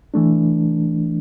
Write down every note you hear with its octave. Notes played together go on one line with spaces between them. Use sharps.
E3 A3 D4